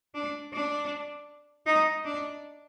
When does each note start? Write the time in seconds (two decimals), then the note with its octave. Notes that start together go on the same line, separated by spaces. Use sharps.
0.15 D4
0.53 D4
1.66 D#4
2.05 D4